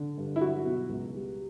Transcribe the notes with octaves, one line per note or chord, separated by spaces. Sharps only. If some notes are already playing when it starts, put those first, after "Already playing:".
Already playing: D3
G2
E4
F#3 F#4
B2
C#2
G3